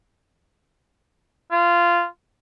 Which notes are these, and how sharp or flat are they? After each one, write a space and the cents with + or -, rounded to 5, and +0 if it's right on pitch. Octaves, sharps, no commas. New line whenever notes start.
F4 -15